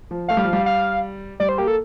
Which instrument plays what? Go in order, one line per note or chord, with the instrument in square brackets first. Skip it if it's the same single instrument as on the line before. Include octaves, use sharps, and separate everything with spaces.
[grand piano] F3
[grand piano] A3 [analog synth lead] F5
[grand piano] G3
F3
G3
[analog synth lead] F5
[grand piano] G3 [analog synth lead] D5
[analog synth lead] C5
[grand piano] A#3 [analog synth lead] G4
[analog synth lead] A4